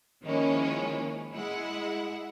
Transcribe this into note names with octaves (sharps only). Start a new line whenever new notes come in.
D#3 F3 G#3 A#3 C#4 E4
G#3 E4 F#5